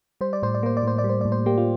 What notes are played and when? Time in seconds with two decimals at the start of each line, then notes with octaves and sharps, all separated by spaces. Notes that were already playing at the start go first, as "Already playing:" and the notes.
0.21 G3 C5
0.33 D5
0.42 A2 C5
0.54 D5
0.63 A#3 C5
0.77 D5
0.83 A2 C5
0.98 D5
1.04 G3
1.09 C5
1.21 A2 D5
1.32 C5
1.46 A#3 G4
1.58 F4